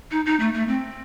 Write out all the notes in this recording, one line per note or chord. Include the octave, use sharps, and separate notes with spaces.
D#4
D#4
A3
A3
C4